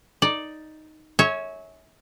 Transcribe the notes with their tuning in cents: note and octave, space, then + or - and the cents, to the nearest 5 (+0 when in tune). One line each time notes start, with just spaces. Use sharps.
D#4 +0 D5 +0
C#5 +0 E5 -30 G#5 +20